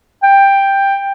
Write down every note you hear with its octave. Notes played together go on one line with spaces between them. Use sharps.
G5